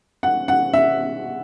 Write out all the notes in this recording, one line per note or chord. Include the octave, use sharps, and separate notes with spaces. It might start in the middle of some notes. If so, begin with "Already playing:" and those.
F#5
F#5
E5